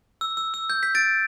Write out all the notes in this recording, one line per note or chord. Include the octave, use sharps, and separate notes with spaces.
E6
E6
E6
G6
G6 B6
A6 D7